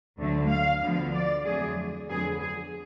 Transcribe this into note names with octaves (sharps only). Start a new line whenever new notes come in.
D2 D3 F#3 A3
F5
D2 D3 F3 B3
D5
F2 D3 F#3 A3 G#4
F2 D3 F#3 B3 G#4
G#4